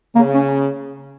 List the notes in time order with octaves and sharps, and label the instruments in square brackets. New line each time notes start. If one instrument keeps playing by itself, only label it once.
[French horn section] C#3 [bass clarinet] A#3
[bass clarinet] C#4